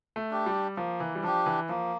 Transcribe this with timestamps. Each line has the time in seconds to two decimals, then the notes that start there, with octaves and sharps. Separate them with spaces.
0.16 A3
0.31 D4 G4
0.46 G3
0.77 F3 A#3
1.00 E3
1.15 G3
1.23 F3 D4 G4
1.46 E3
1.69 F3 A#3